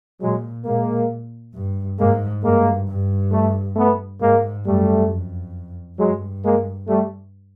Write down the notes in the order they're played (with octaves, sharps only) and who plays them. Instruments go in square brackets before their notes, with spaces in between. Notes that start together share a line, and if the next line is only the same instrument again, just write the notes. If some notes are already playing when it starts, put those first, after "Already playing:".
[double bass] A#2 [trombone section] F#3 G#3
[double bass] A#2 [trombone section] G#3 A#3
[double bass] G2
[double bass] G#2 [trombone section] G#3 A#3
[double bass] G2 [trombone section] G#3 A#3
[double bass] G2
[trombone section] G3 A3
A3 B3
[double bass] G#2 [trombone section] G#3 A#3
[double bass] F#2 [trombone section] G3 A3
[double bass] F2
[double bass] G2 [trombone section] F#3 G#3
[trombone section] G#3 A#3
G3 A3